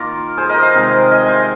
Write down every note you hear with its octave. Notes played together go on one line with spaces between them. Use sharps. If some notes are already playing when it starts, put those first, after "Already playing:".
Already playing: D#3 A#3 F4 A#4
G#4 C5
A#4 D#5
C5 F5
C3 D#3 G#3
D#5 G#5
G#5
C5 F5